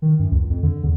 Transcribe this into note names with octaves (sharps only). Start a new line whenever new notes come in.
D#3
F#2
C#2
F2
D3
E2